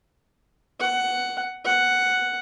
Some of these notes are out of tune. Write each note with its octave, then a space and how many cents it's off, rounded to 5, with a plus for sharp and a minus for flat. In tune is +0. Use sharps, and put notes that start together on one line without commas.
F#5 +10
F#5 +5